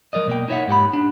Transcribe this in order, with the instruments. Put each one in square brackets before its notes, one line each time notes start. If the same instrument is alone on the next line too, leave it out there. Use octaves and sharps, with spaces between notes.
[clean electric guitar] F#3 A#4 D5 D#5
B2 A#3 G5
D#4 E4 C#5 D5 E5 F#5
G#2 G4 F#5 B5
D4